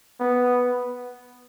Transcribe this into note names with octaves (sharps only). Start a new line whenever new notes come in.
B3